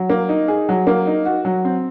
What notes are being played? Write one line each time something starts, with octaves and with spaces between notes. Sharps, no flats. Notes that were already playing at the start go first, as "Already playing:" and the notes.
Already playing: F#3
A#3
D#4
G#4
F#3
A#3
D#4
F#4
F#3
C4